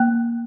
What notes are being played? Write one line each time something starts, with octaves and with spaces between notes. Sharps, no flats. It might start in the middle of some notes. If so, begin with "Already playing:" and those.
Already playing: A#3